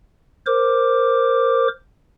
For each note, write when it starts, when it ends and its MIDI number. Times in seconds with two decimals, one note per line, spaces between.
0.46 1.68 70
0.46 1.68 72
0.46 1.68 86